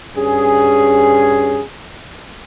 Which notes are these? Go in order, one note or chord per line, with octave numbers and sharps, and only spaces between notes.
G2 C#4 G#4